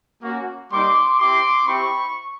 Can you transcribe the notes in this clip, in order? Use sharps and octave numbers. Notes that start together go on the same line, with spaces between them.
A#3 C#4 F#4
G3 A#3 D#4 C6 D6
C4 E4 G4 C6 D6
C4 E4 G4 B5 C#6